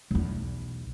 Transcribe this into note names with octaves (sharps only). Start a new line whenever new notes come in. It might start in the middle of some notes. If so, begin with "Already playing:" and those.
B1 E2